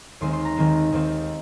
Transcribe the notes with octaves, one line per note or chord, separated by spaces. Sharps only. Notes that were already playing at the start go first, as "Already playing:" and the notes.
D#2 D#3 G#3 C4 C6
C6
A#5
D#2 D#3 G#3 C4
D#2 D#3 C4